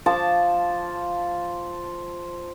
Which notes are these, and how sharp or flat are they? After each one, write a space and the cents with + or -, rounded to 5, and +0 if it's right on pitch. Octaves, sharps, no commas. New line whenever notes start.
F3 +0 A5 +0 D6 -35